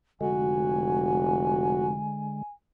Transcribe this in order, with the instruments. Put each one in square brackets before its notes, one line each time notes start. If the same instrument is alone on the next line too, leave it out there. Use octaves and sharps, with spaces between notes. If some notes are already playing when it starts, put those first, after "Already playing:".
[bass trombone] F1 [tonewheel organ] D3 G#3 [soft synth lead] F#4 [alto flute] G#5